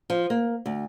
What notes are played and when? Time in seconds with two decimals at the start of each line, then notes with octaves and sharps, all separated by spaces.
0.10 F3
0.30 A#3
0.66 D2